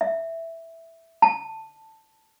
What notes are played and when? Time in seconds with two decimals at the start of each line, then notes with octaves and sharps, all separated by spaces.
0.01 E5
1.22 A5